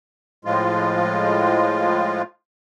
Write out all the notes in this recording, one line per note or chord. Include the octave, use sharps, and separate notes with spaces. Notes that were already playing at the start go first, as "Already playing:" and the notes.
A2 F3 G#3 F4